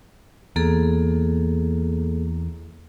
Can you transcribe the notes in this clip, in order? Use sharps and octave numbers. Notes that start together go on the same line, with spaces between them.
E2 A#3 G#4 A4